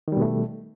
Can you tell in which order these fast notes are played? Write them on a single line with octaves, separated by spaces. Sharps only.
D#3 G3 B2 A3